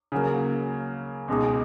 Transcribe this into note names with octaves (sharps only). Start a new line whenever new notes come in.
C#3 F#3 A#3
C#2 B2 G#3 D#4